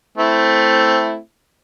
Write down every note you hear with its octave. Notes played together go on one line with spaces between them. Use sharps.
A3 C4 E4